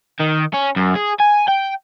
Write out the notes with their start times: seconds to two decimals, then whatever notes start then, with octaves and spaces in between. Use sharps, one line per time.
0.20 D#3
0.54 C#4
0.76 F#2
0.95 G#4
1.20 G#5
1.48 G5